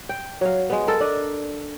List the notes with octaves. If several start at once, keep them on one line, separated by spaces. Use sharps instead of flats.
G5
F#3 F5
G#3 B3
A4 A#4
D4 D#5